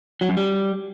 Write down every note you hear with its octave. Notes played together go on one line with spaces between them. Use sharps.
F#3
F#2
G3